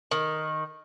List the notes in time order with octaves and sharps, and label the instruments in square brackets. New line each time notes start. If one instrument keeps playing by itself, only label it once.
[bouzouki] D#3